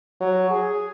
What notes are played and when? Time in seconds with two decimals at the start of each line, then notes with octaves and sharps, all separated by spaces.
0.20 F#3
0.51 G#4